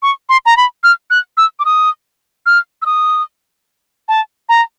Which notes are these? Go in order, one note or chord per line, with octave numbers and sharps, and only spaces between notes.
C#6
C6
A#5
B5
F6
F#6
E6
D6
D#6
F6
E6
D#6
A5
A#5